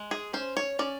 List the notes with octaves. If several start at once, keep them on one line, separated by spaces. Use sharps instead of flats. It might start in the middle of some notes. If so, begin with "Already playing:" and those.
Already playing: G#3
G#4
C#4 C5
C#5
C#4 D5